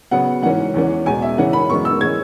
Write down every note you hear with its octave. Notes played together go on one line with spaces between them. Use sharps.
C#3 F#3 B3 F#5
G#2 E3 C#4 F#5
E2 E3 C#4
E2 B2 G#3 G#5
E5
C#3 E3 C#4 F#5
B5
F#2 E3 G#3 B3 C#6
E6
E3 G#3 C#4 G#6